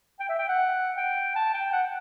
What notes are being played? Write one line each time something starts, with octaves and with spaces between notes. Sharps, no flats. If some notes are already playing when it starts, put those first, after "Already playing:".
G5
E5
G5
F#5
G5
A5
G5
F#5